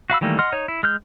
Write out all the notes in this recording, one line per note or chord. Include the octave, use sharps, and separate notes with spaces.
F#4 F5 B5 E6
D#3 E3 G3 A3 A#3
D#5 F#5 C6 F6
D#4 C#5
E4
G#3 F6 G6